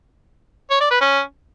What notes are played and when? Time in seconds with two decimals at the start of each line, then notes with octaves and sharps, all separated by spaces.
0.70 C#5
0.81 D5
0.91 B4
1.01 C#4